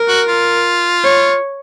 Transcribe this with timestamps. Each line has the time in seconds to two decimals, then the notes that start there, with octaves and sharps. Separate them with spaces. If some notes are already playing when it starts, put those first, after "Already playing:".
Already playing: A#4
0.09 F#4
0.28 F4
1.03 C#5